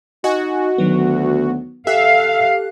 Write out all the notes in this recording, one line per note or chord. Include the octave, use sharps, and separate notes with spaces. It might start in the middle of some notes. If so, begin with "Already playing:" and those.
D#4 F#4 D#5 G#5
D2 D#3 F#3 B3
G4 A4 E5 F5 F#6